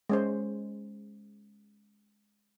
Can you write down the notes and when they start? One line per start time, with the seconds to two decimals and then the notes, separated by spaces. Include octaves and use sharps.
0.09 G#3 C#4 C5